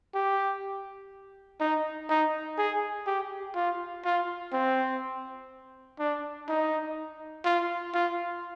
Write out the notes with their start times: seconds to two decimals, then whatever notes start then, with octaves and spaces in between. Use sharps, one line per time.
0.14 G4
1.60 D#4
2.09 D#4
2.58 G#4
3.07 G4
3.55 F4
4.05 F4
4.53 C4
5.99 D4
6.49 D#4
7.45 F4
7.94 F4